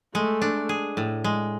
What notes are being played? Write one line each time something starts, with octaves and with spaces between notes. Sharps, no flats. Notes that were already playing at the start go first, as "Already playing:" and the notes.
G#3 A3
D4
G#4
A2
G#3